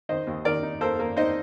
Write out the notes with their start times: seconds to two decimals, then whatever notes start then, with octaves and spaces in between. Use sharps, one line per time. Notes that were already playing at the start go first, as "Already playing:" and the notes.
0.09 D#3 C5 D#5
0.27 D#2
0.45 D#3 A#4 D5
0.63 D#4
0.81 A#3 A4 C5
0.99 A#3
1.16 D#4 C5 D#5